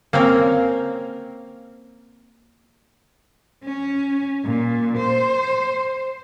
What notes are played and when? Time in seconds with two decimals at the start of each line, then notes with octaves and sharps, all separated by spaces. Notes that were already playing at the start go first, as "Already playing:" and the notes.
0.13 A#3 C4 C#4 A#4
3.64 C#4
4.45 A#2
4.98 C5